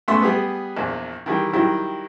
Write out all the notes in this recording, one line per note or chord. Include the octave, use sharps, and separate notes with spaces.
C#2 A3 B3 E5 C6 C#6
G3 B3 G#4 B4
A#1 E2
D#3 E3 G3
D#3 F#3 G3 E4